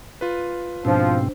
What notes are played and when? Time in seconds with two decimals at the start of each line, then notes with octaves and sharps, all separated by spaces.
0.21 F4 B4
0.85 G#2 B2 F3 C4 D4 C5